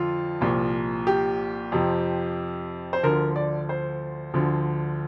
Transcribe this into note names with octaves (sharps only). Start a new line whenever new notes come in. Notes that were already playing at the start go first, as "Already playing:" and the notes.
Already playing: F2 D3 F3 F4
C2 A#2 F3
G4
F2 C3 F3
C5
D2 D3 F3 A#4
D5
C5
D2 D3 F3